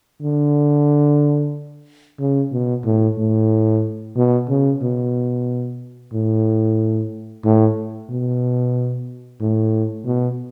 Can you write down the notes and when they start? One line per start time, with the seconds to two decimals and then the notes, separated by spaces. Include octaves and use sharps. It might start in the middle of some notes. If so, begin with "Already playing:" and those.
0.22 D3
2.20 C#3
2.52 B2
2.85 A2
3.18 A2
4.16 B2
4.49 C#3
4.82 B2
6.13 A2
7.45 A2
8.10 B2
9.41 A2
10.06 B2